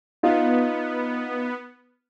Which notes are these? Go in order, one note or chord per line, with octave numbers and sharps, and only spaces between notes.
B3 D#4 F4